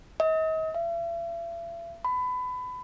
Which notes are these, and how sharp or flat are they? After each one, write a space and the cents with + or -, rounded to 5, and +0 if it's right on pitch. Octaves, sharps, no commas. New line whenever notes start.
D#5 +40
E5 +45
B5 +25